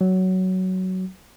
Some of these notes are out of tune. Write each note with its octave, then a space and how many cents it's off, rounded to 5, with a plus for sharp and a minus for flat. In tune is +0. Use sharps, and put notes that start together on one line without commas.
F#3 +10